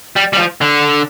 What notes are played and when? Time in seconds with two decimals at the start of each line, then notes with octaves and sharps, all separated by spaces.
0.16 G3
0.33 G3
0.38 F3
0.61 D3